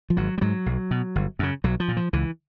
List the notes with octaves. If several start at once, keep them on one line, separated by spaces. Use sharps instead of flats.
F3
G#1 F#3
G3
G#2 F#3
B1
B2
G1
F#2 C#3
B1 F#3
F3
A#2
F3
C#2 E3